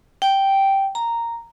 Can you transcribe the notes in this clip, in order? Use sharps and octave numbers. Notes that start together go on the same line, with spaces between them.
G5
A#5